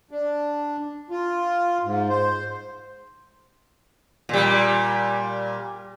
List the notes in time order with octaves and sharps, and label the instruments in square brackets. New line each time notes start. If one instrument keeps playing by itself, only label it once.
[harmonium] D4
F4
G#2
C5
[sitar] A#2 G3